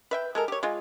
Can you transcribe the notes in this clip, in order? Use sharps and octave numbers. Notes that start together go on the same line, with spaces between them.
B4 E5 G5
G#3 A4 A#4
G4 C#5
G#3 F4